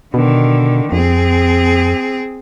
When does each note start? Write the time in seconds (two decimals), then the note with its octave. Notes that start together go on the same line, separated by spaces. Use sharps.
0.14 B2 D3 D#3
0.92 F2 C4 G#4